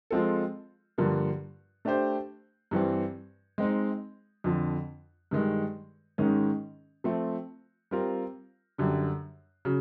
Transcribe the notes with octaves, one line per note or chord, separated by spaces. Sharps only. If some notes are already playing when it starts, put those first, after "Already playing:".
F3 G#3 C4 F4 A4
G2 D3 F3 A#3
A3 D4 G4 C5
G2 E3 G3 C4
G#3 C4 D#4
F2 D3 F3
G2 D#3 G#3
G#2 D#3 G#3 C#4
F3 A3 C4
G3 C4 F4 A#4
F#2 D3 G3
C#3 F#3